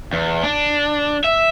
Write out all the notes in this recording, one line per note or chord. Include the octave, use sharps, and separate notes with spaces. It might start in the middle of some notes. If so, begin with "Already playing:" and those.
E2
D4
E5